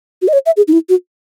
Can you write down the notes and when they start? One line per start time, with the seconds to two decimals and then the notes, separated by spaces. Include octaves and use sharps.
0.22 F#4
0.28 D#5
0.33 C#5
0.46 E5
0.57 G#4
0.68 D#4
0.73 E4
0.89 F#4